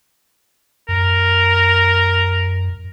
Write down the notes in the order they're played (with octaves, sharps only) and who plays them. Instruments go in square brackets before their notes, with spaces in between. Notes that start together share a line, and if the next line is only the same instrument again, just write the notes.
[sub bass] F#2 [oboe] A#4